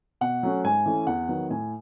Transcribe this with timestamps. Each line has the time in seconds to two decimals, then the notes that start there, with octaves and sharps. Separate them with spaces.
0.21 B2 F#5
0.43 F#3 A3 C#4
0.64 G#2 G#5
0.86 E3 A3 C#4
1.07 E2 F#5
1.28 D#3 F#3 B3
1.50 A2 G#5